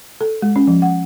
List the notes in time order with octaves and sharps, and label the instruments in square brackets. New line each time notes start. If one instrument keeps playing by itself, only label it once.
[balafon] A4
G#3
C#4
F3
F#5